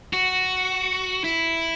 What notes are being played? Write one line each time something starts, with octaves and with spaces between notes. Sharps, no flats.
F#4
E4